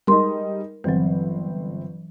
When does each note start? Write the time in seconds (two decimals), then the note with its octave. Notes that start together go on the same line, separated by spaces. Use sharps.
0.07 G3 G#3 D#4 A#4 C6
0.84 G1 E3 F#3 C4